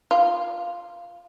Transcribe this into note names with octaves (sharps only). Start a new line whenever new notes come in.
F4